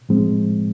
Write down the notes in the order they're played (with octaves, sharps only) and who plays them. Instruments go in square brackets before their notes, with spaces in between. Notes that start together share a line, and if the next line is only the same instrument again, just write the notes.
[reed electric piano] A2 F3 G#3 C4